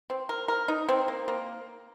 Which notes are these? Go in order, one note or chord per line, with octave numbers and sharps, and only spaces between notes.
C4
A#4
A#4
D#4
C4
A#3
A#3